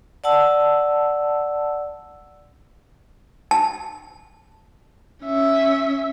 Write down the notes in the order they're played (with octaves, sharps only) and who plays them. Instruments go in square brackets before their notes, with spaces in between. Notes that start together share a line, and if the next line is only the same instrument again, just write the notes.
[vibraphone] D5 F#5 A5 E6
[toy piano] A5
[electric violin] C#4 E5